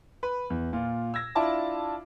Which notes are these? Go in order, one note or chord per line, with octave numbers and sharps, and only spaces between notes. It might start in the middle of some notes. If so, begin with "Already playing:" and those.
B4
E2
A#2 F4
E6 G#6 A#6
D4 E4 F4 E5 A5 D6